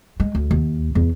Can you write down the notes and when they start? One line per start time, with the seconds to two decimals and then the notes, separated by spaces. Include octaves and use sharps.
0.20 G#3
0.35 D2
0.51 D#2
0.95 E2